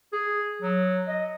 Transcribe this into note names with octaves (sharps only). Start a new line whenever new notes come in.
G#4
F#3
D#5